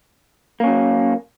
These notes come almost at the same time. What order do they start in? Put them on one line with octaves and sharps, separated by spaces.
A#3 C#4 F#3